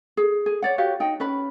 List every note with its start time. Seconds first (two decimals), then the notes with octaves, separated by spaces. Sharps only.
0.17 G#4
0.46 G#4
0.62 C#5 D5 F#5
0.78 F#4 G4 C#5 F5
1.00 D#4 D#5 G5
1.20 C#4 B4 B5